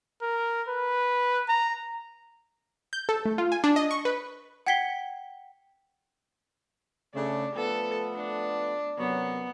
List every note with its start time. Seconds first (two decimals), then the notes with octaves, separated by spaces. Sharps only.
0.22 A#4
0.68 B4
1.48 A#5
2.93 G6
3.09 A4
3.25 A3
3.38 F4
3.52 G#5
3.64 D4
3.76 D#5
3.91 C#6
4.05 B4
4.66 F#5 G5 G#6 B6 C7 G7
7.14 C#3 A3 D4
7.55 F3 A3 B3 A4
8.15 D4
8.98 F#2 C3 F#3 B3